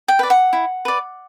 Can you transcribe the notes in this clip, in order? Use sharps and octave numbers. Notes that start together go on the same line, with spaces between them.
G5
B4 D5
F#5
E4
B4 D5